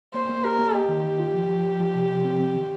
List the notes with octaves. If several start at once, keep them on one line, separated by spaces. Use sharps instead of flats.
A#3 C5
A#3
G4 A#4
A#3
G4 D#5
D#3
D#3
F4
F3
F3
F3
F3
C3
C3
C4
C4
D#3